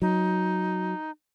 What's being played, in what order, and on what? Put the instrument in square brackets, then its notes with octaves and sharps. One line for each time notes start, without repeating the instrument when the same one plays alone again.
[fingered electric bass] F#3 [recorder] D#4